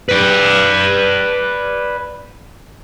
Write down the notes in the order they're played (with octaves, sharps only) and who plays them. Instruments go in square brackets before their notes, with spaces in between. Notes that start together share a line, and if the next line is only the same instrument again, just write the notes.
[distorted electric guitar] B4 D5